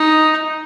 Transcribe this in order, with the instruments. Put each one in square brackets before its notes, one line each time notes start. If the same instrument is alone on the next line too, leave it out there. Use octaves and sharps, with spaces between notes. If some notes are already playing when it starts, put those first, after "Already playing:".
Already playing: [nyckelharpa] D#4